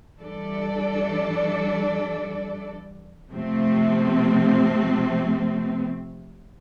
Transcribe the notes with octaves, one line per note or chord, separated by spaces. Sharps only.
E3 G3 D4 A4 D5
C3 F3 A3 C4